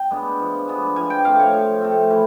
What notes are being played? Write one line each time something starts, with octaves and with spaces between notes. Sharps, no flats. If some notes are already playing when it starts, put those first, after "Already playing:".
Already playing: G5
G#3 B3 D4
F3
G#3 B3 D4
F3 G#5
G5
A3 C4 F5
C#5
F3
A3 C4
E3